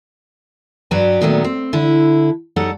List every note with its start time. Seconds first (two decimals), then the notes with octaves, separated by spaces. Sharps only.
0.91 G2 F#3 F#4 G4 B4
1.21 A#2 D#3 F#3 A3 B3
1.44 C4
1.73 D3 E4
2.56 F#2 F#3 G3 D#4 A4 F#5